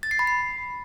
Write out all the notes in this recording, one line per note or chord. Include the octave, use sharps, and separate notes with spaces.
A6
C7
B5
C7